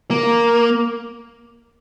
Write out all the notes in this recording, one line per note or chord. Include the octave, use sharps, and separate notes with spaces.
A#3